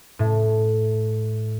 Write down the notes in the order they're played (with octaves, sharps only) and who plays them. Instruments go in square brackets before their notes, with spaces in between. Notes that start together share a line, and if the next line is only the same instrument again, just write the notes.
[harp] A2